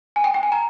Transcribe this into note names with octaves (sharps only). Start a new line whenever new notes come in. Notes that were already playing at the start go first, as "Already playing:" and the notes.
G#5
G5
G5
G#5
A#5